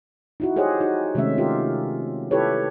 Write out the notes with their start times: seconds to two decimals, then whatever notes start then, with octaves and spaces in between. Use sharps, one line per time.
0.40 D#4 E4 F#4
0.56 G4 G#4 C5 C#5 D#5 F#5
0.81 D#4 F#4
1.15 C3 D#3 G#3 A3 C#4 E5
1.38 F4 G4 A#4
2.31 E4 G4 A4 B4 C#5